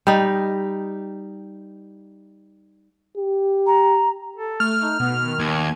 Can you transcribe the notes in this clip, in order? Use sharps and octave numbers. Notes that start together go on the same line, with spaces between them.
G3 D#4
G4
A#5
A4
A3 F6
D#4
B2 B3
D#3
D#2 G#6